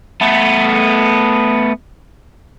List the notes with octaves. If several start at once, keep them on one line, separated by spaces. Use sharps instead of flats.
A3 B3